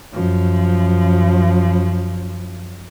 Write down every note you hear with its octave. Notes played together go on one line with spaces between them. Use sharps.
F#2 F3